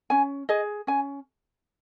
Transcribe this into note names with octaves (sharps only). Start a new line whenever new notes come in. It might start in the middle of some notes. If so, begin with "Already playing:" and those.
C#4 G#5
G#4 D#5
C#4 G#5